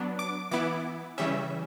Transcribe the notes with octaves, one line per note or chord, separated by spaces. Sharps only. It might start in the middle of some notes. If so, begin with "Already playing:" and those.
Already playing: F#3 B3 D4
D6
E3 B3 E4 D6
C#3 E3 G3 C#4 E5